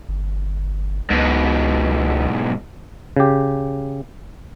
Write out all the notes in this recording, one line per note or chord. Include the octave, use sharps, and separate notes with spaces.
G1
C#2 G#2 B2
C#3 G4